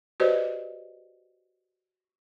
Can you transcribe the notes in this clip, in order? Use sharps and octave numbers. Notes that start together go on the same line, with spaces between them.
F#4 G4 B4 C5 D5 D#5